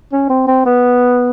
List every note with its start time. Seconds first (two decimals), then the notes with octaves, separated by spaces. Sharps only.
0.12 C#4
0.29 C4
0.47 C4
0.65 B3